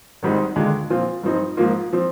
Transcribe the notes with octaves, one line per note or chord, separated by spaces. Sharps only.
G#1 G#2 G3 C4 D#4
D#2 D3 G#3 D4 F4
A#2 F3 C4 F4
G2 F3 C4 D#4
G#2 F3 A#3 F4
F3 C4